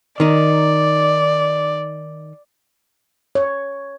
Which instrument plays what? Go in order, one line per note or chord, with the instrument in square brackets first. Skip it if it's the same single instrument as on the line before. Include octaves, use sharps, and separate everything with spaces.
[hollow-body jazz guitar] D#3 D#4 [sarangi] D5
[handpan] C#5